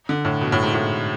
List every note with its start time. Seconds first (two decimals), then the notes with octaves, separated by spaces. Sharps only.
0.09 D3
0.25 A2
0.41 B2
0.52 A2
0.63 G#2
0.74 A2